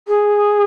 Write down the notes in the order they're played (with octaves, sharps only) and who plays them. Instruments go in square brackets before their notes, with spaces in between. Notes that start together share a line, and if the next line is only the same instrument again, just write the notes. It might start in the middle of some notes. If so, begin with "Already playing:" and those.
[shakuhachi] G#4